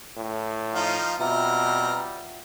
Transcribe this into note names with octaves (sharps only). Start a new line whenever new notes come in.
A2
F3 D#4 F5
B2 G3 C4 F4 E5 F#5 A#5 F6